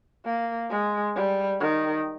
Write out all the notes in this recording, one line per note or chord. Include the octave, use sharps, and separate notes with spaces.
A#3
G#3
G3
D#3